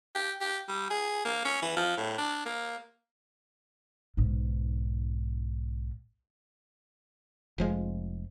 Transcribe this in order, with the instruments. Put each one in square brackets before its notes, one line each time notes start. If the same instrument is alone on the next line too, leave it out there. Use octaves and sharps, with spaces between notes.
[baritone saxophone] G4
G4
G3
G#4
A#3
C#4
E3
F3
A2
D4
A#3
[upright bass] B1 G#2
[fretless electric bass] F1 F3 G#3